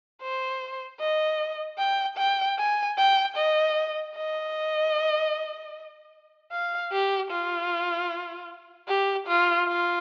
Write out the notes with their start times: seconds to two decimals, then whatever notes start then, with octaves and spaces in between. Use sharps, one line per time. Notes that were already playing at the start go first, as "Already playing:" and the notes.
0.22 C5
1.00 D#5
1.79 G5
2.18 G5
2.58 G#5
2.98 G5
3.37 D#5
4.16 D#5
6.52 F5
6.92 G4
7.31 F4
8.88 G4
9.27 F4
9.68 F4